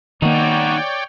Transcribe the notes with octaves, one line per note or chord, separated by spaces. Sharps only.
D#3 A#3 D#4 F#4 C#5 D5 G5